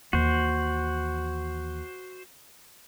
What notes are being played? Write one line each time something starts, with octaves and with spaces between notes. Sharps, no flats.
D#2 E3 F#4 C5